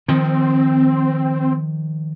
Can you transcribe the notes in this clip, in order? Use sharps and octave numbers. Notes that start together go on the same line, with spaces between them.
D#3 F3 C4